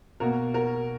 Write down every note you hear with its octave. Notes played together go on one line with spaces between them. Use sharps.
B2 A#3 F#4 A#4
F#4 A#4